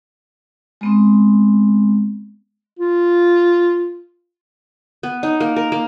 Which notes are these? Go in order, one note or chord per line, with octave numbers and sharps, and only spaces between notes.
G#3 B3 C4
F4
B3
D#4
A#3
A#4
A#3